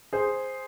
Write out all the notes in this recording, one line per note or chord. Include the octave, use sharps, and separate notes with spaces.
G#4 C5